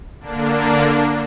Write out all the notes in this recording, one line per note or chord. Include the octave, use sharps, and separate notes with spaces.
D3 A#3 D4